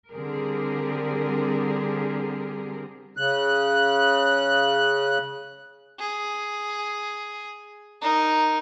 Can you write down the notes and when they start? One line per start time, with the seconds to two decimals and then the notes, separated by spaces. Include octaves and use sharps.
0.11 D3 G3 C4 G4 G#4 A#4
3.17 C#3 F#6
5.99 G#4
8.01 D#4 A#4